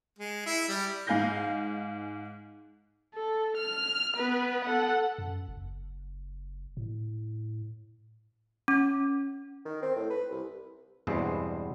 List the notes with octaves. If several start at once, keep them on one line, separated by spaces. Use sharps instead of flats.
G#3
E4
G3
G#2 F5 G#5 G6 A#6
A4
F6
B3 B4
A4 F#5
F#2
F#1
A2
C#4
D#3
C4
A2
B4
C2
E2 G2 B2 G#3 B3 C4